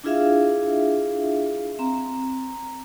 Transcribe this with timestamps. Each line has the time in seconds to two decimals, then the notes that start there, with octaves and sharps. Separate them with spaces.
0.04 D4 E4 F4 G#4 E5 F5
1.79 C4 A#5